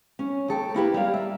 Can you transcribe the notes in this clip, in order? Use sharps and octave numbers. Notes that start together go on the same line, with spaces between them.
C#4
D#2 A4 G5
A#3 E4 G4 B4
G3 A#3 F5
E5